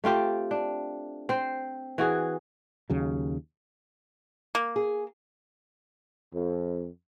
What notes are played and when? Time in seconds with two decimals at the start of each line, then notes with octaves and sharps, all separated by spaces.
0.04 A3 C4 F4 G4
0.51 D4
1.29 C4 C5
1.98 E3 F#4 G#4
2.90 D#2 C#3 F#3
4.55 A#3
4.76 G#4
6.33 F2